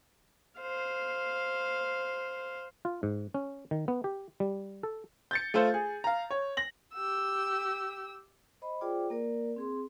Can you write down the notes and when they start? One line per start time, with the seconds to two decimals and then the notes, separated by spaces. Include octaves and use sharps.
0.60 C5 F5
2.85 F4
3.03 G#2
3.34 C#4
3.71 D#3
3.88 B3
4.04 G4
4.40 G3
4.83 A4
5.31 G6 A6 C#7
5.54 A3 F4 A4 C5
5.74 G#4
6.04 F5 A#5
6.30 C#5
6.57 A#6 F#7
6.94 G4 E6
8.62 C5 D#5 B5
8.81 F4 G#4 C5 D5 G5 D6
9.10 A#3 A#4 D5
9.56 C4 G#4 C6